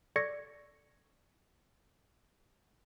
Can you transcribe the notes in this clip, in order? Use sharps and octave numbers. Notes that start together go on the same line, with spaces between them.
A4 D5 C#6 G#6 A#6 C#7